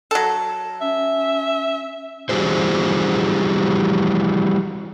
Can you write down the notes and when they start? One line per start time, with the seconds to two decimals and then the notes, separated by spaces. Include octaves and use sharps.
0.11 F#3 A4
0.81 C#4 E5
2.29 E3 G3 D#4 F#4 G#4 C5